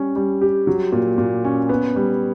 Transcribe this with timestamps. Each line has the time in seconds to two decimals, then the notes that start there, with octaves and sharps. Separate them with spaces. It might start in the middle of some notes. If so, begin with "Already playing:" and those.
Already playing: G3 C#4
0.16 G3
0.41 G4
0.67 F#3
0.92 A#2
1.18 A#2
1.44 C#4
1.69 B3
1.96 G3